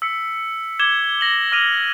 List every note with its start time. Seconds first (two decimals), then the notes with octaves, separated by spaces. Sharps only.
0.02 E6 B6 C#7
0.79 D6 G#6 E7 G7
1.21 A#6 F#7
1.52 D6 F6 A#6 D#7 F7 F#7